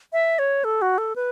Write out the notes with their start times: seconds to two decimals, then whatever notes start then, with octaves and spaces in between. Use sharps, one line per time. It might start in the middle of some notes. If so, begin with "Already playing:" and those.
0.13 E5
0.39 C#5
0.64 A4
0.82 F#4
0.98 A4
1.16 B4